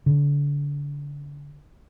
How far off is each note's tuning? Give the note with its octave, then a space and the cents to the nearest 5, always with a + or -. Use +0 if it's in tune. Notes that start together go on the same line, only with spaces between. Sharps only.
D3 -35